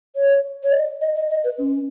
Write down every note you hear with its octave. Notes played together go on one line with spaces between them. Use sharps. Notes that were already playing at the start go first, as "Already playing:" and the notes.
C#5
C#5
D#5
D#5
D#5
D#5
B4
C#4